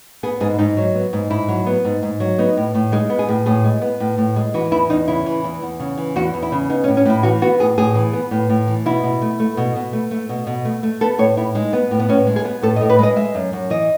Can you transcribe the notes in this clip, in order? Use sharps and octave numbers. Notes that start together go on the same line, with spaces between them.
B3 G#4
G#2 G#4
G#2 D#4
F#3
B3
G#2
G#2 E4
F#3
B3
G#2
G#2
F#3
B3 D#4
A2
A2
G#3 D#4
B3
G#4
A2
A2 G#4
G#3
B3
A2
A2
G#3
E3 F#4
E2 E4
E2 D#4
C#3 E4
E3
E2
E2
C#3
E3
E2 F#4
E2
E4
C#3
B3 D#4
C#4
A2
C#4
A2 E4
E3 F#4
B3 F#4
A2 G#4
A2 G#4
E3
B3
A2
A2
E3
B2 E4
B2
A3
A3
B2
B2
A3
A3
B2
B2
A3
A3
B3 A4
A2 C#5
A2 E4
G#3 D#4
B3
A2
B3
A2 C#4
G#3
G#4
B3
A2 A4
D#5
A2
B4
G#3 D#5
G#3 E5
F#2
F#2
E3 D#5